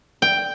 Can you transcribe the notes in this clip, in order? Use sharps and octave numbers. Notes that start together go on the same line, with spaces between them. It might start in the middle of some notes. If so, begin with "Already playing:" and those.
G5